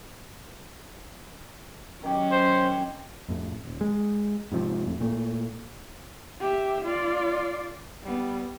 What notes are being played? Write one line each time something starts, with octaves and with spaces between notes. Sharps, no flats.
D#3 F#3 C#4 G4
C5
F2 A2
D#1
G#3
G#2 C3 F3
F2 A2
A#2 A3
G4 E5
F4 D5
G3 B3